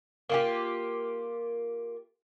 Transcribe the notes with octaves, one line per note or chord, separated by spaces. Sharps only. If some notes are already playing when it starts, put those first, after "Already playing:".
A#3 F4 G4